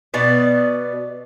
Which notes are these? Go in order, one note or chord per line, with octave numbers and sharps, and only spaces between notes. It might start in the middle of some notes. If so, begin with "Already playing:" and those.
B2 B3 D5